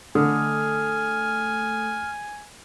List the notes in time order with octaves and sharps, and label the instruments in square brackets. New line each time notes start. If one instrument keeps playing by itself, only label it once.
[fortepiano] D3 [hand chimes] A3 A4 D#6 [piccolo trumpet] G#5 [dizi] F6